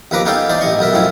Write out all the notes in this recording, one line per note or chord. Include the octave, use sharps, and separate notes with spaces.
D#2 F3 B4 A#5 D6
B3 C#4 D#4 A4 F5 G5
E3 D#4 C5 D5
A1 E3 D#5 C#6
B1 B3 A#4 E5
F#2 A2 F3 C#4 E4